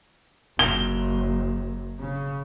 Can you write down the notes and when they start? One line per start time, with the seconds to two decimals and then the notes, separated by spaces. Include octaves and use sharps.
0.59 F#1 G7
2.00 C#3